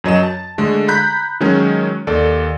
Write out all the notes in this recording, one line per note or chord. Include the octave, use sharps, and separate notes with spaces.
F#2 F#3 D#5 E7
A5
D3 G#3 A3
A#5 B5 F#6 G6 B6
D#3 F#3 G#3 C#4
D#2 A4 D5